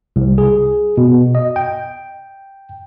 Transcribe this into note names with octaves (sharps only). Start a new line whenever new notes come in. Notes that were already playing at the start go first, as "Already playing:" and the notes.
C2
G#4
B2
D#5
G5